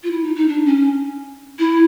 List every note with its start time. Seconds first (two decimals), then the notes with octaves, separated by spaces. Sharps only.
0.03 F4
0.11 E4
0.23 D#4
0.35 D#4
0.48 D4
0.66 C#4
1.59 E4